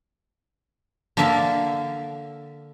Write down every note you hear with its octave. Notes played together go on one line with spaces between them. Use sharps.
D3 A#3 A#4 E5 F5 A5